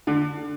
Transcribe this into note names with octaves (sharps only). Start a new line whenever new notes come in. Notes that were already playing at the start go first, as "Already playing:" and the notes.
D3